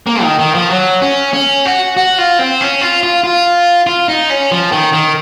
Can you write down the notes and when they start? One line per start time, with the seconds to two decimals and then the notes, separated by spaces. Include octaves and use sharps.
0.07 A#3
0.22 D#3
0.39 D#3
0.54 F3
0.70 F#3
1.02 C#4
1.34 C#4
1.65 F#4
1.97 F#4
2.18 F4
2.39 C4
2.61 C#4
2.81 F4
3.03 F4
3.24 F4
3.87 F4
4.08 D#4
4.30 C#4
4.51 F3
4.72 D#3
4.93 D#3